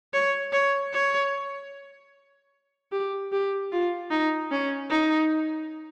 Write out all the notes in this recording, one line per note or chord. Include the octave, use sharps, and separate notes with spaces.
C#5
C#5
C#5
G4
G4
F4
D#4
C#4
D#4